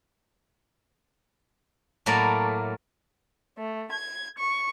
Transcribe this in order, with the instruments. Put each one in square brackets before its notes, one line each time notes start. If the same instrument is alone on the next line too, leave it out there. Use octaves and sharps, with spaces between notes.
[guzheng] A2 F#3 A3 A#3 A#4 D5
[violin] A3
G#6
C#6